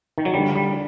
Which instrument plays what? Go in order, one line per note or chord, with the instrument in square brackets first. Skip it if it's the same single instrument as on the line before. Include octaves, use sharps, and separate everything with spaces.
[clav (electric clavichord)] D#3
F#3
[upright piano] D3 [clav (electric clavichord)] G3
[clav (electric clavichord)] G3